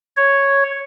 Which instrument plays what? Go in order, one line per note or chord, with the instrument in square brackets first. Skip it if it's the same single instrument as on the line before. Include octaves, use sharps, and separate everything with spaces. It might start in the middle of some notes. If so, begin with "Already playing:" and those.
[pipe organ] C#5